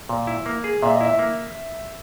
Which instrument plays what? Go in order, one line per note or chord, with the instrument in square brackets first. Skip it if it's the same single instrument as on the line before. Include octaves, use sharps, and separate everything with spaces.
[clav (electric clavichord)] A#2
E4
A#3
G#4
[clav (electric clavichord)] A#2 [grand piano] E5
[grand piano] D#5
[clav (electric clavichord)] E4
[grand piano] E5
[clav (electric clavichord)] A#3